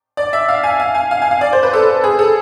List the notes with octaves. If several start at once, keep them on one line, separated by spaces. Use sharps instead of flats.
D5
E5
F5
G#5
F5
G#5
F5
G#5
F5
D5
C5
B4
A4
G#4
A4